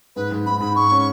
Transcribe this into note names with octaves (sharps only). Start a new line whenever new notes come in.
G#2 B4
G#2
G#2 B5
G#2 B5
G#2 C#6
C#4